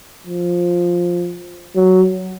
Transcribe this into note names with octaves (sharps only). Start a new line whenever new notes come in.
F3
F#3